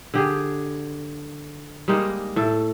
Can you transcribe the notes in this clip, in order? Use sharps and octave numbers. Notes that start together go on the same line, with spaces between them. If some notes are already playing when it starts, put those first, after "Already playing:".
D3 G4 G#4
G3 G#3 A#3 D#4
A2 A4